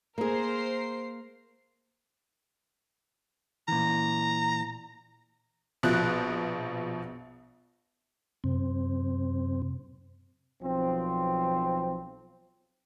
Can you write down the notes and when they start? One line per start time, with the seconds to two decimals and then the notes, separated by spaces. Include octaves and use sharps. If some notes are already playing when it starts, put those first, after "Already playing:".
0.18 A#3 G#4 A#4 C5 C7
3.68 A#2 E3 A#5
5.83 A#1 B2 F3 F#6
8.44 F#2 C3 C4
10.63 B1 F3 C4